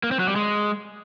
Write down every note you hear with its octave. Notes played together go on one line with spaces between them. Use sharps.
A#3
C4
F#3
G3
G#3